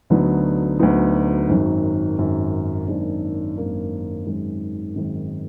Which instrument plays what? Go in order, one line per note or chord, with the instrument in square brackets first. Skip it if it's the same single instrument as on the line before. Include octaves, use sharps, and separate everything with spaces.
[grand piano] D2 D3 F#3 B3 D#4
D2 D3 F#3 B3 D#4
G#1 F#2 D#3 F#3
G#1 F#2 D#3 F#3
G#1 F#2 D#3 A#3 D4
G#1 F#2 D#3 A#3 D4
G#1 F#2 D#3 G#3
G#1 F#2 D#3 G#3